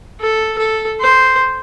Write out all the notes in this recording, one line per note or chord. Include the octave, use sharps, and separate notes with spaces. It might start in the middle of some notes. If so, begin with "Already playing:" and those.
A4
A4
C5